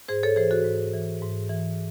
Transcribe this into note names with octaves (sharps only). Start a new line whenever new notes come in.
G#2 G#4 C5
A4 C#5
E3 G#4 C5
F#4 A4
G#2
E3
G#2
E3